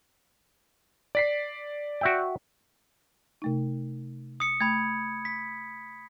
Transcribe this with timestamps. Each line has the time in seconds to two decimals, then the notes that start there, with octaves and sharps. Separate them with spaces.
1.15 D5 B6 C7
2.01 F#4 E5 G5
3.42 C3 A3 D#4
4.40 D#6 C#7
4.61 A3 B5 G#6
5.25 B6